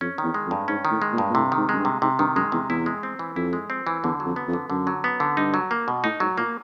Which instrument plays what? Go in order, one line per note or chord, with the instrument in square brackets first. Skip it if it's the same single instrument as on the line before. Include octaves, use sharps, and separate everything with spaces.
[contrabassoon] F2 [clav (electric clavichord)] C#4
[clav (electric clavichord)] D#3
[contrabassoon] E2
[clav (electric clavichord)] G#3
[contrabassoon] F2
[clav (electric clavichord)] G2
[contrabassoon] G#2 [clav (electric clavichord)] C#4
[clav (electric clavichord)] D#3
[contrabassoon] A2
[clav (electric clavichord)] G#3
[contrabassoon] A#2
[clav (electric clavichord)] G2
[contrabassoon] A#2
[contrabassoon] A2 [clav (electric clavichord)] C3
[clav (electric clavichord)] D#3
[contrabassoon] G#2
[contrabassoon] F#2 [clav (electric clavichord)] G#3
[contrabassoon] G2
[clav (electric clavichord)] C3
[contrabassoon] G#2 [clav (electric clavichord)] C3
[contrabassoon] G2 [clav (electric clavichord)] D#3
[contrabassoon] F#2 [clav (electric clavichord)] G#3
[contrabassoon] E2 [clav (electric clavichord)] C3
[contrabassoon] E2 [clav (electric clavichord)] E4
[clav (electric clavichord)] G#3
C4
E3
[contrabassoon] F2 [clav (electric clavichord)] E4
[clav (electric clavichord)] G#3
C4
E3
[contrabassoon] E2 [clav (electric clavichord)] D3
[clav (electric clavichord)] F#3
[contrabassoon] F2
[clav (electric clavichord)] B3
[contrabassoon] F2
[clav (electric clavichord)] D3
[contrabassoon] F#2 [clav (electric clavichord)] D3
[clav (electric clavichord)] F#3
B3
D3
[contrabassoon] G2 [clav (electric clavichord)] D#4
[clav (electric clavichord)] F#3
A#3
B2
[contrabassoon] A2 [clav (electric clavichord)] D#4
[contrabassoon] G#2 [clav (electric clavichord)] F#3
[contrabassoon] A#2 [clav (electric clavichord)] A#3